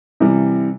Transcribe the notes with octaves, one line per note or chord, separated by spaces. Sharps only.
C3 E3 G3